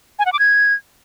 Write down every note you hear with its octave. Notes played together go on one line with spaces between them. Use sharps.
G#5
F#5
D6
G#6